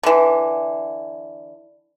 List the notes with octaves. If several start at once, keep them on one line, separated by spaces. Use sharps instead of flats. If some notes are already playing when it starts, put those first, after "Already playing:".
D3 E3